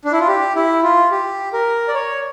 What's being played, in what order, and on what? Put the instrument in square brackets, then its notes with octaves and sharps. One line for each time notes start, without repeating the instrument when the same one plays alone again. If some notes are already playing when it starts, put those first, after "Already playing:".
[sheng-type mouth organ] D4
E4
F4
G4
E4
F4
G4
A#4
D5
C#5